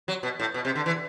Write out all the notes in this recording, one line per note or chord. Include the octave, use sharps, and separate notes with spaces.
F#3
B2
A2
B2
C3
D3
E3